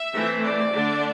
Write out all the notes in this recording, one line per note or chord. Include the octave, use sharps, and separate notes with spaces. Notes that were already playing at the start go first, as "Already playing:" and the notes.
Already playing: E5
E3 A3 C4
D5
D3 A3 D4